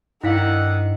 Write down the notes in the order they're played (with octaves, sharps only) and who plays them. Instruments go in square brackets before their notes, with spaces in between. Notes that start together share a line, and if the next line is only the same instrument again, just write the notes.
[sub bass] G2 [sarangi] D#3 [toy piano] E4 F5 [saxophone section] A4 D5 F#5